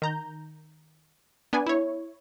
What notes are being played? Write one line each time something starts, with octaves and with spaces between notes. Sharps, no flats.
D#3 A#5 G6
B3 D4 D5 G#5
E4 C#5